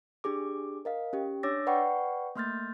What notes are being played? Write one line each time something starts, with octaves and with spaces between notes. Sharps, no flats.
D4 G4 G#4 D6
A#4 D#5 F5
C#4 G4
D4 C#5 D6 E6 A6 A#6
B4 D5 F#5 G5 B5 C#6
A3 A#3 C6 F6 G6 A6